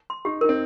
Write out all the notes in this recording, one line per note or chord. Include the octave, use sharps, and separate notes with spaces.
C6
D#4 G4
D#4 A#4
C4